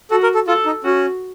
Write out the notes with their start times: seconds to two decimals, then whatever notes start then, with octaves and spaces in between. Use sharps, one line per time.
0.10 F#4 A4
0.23 A#4
0.35 A4
0.48 F4 A4
0.66 D#4
0.83 C#4 F#4